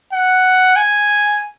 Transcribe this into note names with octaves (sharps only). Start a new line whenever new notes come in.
F#5
G#5